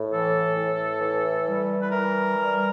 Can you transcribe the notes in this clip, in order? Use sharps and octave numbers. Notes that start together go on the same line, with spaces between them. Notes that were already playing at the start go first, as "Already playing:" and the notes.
Already playing: A2
E3 A4
A2
E3
G3
B4
E3 A#4
G3